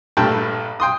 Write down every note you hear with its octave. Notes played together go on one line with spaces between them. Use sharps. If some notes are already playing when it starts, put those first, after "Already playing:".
A#1 G2 A3 G5 A5
G5 C6 D#6